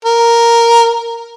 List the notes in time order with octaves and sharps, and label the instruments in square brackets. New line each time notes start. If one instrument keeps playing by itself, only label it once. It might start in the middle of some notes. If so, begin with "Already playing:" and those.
[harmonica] A#4